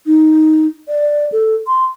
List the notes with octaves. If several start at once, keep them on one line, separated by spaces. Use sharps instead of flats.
D#4
D5
A4
C6